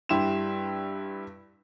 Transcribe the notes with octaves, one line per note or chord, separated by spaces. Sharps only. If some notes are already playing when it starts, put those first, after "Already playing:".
G2 G3 E4 G4 C6 E7